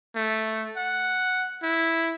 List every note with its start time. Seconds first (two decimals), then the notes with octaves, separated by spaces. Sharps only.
0.15 A3
0.77 F#5
1.63 E4